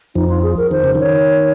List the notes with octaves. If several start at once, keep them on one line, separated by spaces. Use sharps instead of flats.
F2 F3 D#4
F4
G#4
A#4
D#3 C5
C#3
D#3 C#5